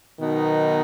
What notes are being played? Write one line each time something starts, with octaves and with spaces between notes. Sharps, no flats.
B2 D#3 F#3 B3 D#4